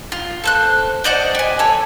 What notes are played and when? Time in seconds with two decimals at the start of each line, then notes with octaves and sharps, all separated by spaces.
0.12 F4
0.44 A4 C5 F#6
1.04 C5 D5 D#5 F#5
1.35 G4 G#5
1.59 A4 C#5